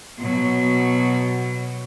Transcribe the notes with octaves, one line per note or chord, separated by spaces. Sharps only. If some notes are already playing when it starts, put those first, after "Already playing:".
B2 F#3